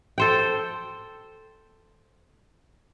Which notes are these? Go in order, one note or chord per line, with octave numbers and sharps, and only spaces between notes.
A4 C5 G5